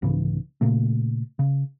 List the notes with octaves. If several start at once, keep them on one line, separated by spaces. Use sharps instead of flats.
C2 G#2 C#3 E3
A#2 C#3 A3
C#3